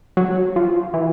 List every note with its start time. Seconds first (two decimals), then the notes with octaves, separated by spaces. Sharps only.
0.17 F#3
0.56 F3
0.94 E3